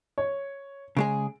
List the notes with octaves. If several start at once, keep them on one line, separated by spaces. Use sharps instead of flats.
C#5
C#3 G#3 G#4 D7